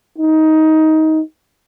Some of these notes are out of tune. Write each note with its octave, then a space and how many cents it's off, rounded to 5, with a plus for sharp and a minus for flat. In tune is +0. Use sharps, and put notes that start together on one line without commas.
D#4 +15